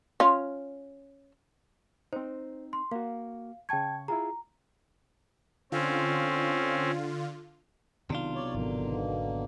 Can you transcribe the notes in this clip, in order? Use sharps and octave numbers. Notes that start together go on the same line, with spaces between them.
C#4 F4
C4 D#4 C5
C6
A#3 F#4 F5
C#3 G5 A5 C#6 G#6
E4 F4 G#4 A#5
D3 C4 C#4 F4
B1 C3 D#3 D4 F4
C#5 D5
G#1 B2 D3 D#3 F#3 A#3